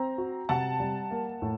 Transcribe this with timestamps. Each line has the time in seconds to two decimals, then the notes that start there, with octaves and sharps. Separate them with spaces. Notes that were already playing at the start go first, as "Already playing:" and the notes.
Already playing: C4 A#5
0.18 F#4
0.49 C3 F#5 A5
0.80 G3
1.11 A#3
1.42 A2